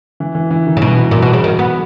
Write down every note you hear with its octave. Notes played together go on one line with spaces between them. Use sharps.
E3
E3
E3
D#3
C#3
B2 E3
F#3
A#2 E3
B2
F#3
C#3
D#3
B3